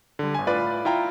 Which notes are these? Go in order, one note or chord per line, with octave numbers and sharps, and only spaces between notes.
D3 G3
G1 G#5
A2 F4 B4 D5
E4 F4 G5 A#5